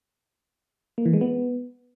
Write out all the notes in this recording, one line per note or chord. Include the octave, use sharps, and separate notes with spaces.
A#3
E3
G#3
B3